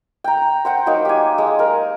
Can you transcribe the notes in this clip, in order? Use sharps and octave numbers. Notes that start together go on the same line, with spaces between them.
G5 A#5
C5 F#5 G5
F#3 A#3 D#4
G4 G#5
G#3
A#4